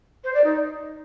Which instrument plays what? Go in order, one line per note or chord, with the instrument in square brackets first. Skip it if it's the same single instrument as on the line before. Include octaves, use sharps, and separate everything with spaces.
[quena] C5
D5
D#4